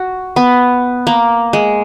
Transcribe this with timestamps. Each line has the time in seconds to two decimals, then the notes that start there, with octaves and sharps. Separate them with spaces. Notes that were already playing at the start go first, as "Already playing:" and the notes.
Already playing: F#4
0.36 B3
1.07 A#3
1.53 G#3